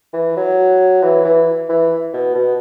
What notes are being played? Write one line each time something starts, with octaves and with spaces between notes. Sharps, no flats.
E3
F#3
E3
E3
E3
B2
B2